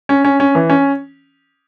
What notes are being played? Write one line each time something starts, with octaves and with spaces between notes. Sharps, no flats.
C#4
C#4
C#4
E3
C#4